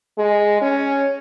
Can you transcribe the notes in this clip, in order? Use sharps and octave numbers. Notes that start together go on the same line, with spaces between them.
G#3
C#4